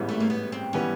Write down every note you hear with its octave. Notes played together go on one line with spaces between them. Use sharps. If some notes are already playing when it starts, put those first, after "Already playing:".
Already playing: A1 G#2 E3 G3 B3
A3
A#3
B3
C4
E3 G3 B3 C#4